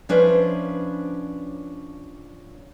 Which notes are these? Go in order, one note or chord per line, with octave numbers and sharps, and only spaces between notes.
F3 C#4 D4 E4 B4 C5